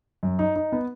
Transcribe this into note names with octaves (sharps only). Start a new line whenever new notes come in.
F#2
D#4
D#4
B3